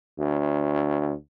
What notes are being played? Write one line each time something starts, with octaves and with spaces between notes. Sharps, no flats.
D2